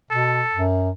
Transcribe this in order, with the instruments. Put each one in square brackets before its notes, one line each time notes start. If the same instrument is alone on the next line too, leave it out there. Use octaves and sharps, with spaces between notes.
[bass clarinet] B2 [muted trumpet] A4
[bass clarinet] F#2